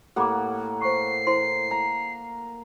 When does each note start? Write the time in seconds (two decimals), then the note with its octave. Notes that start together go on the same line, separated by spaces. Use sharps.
0.16 A2 A#3 G4 F#5 B5 D6
0.82 C5 C#6 C7
1.27 E4 C5 C6
1.71 A#5